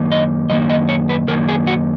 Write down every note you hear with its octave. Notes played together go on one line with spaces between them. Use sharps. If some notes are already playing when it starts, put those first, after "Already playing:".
Already playing: F#2 D#3 A#3
D#5
F#2 D#3 A#3 D#5
D#5
C#5
B4
F#2 D#3 A#3 A#4
G#4
F#4